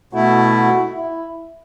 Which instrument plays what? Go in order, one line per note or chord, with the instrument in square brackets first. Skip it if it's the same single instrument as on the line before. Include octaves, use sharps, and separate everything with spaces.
[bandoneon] B2 A3 E4 [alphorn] F#4
[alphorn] F#4
E4